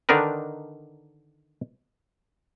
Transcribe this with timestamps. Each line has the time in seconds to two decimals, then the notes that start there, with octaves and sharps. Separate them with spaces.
0.09 D3 D#3 D4 D#4 A#4 B4